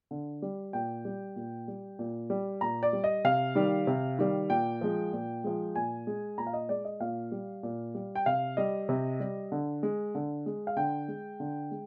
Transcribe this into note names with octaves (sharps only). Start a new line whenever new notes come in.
D3
G3
A#2 G5
G3
A#2
G3
A#2
G3
A#2 A#5
D5
G3
D#5
C3 F5
D#3 G3
C3
D#3 G3
A#2 G5
F3 G#3
A#2
F3 G#3
A#2 G#5
G#3
A#2 A#5
F5
D#5
G#3 D5
D#5
A#2 F5
G3
A#2
G3
G5
C3 F5
G3 D#5
C3
G3
D3
G#3
D3
G#3
F5
D3 G5
G#3
D3
G#3